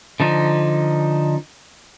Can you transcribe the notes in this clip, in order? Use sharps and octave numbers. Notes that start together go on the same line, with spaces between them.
D3 F3 D#4